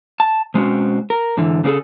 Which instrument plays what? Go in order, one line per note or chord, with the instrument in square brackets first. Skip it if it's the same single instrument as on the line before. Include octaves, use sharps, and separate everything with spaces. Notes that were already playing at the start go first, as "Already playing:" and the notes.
[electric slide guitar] A5
B2 G#3 C4 C#4 F#4
A#4
G#2 D3 E3
C#3 A#3 C4 G#4 A4